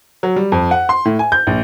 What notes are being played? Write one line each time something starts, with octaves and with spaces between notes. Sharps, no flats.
F#3
G3
F2
F#5
C6
A2
G#5
G6
A#1